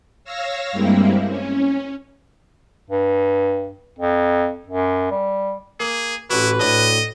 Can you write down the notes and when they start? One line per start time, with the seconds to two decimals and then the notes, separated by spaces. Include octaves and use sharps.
0.24 C#5 F5 E6 A#6
0.72 G2 G3 G#3 A#3 C4 E4
1.28 C#4
2.90 G2
3.98 F2
4.67 F#2
5.11 G3
5.80 A#3 G#4
6.30 A1 E4 F#4 B4
6.60 D2 A2 D#5